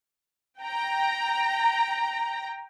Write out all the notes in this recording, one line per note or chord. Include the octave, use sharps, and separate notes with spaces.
G5 A#5